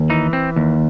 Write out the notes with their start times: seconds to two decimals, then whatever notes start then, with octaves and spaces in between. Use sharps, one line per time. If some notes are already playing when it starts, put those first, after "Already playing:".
Already playing: D#2
0.10 E3 D#4
0.33 C4
0.56 D#2